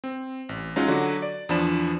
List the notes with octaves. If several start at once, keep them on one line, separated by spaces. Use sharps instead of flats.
C4
A1
F#3 G#3 C#4 D#4 F4
D3 F#3 F#4
D5
E2 F3 D4 B5 E7